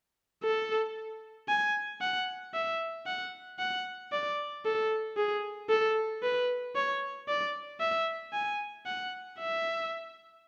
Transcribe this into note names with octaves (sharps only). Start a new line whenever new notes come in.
A4
G#5
F#5
E5
F#5
F#5
D5
A4
G#4
A4
B4
C#5
D5
E5
G#5
F#5
E5